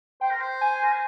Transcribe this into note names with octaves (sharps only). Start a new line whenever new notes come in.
C5 G5
A#4
C5
G#5
A#4
C5